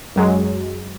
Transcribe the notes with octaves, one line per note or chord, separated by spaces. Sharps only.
F#2 F#3 G#3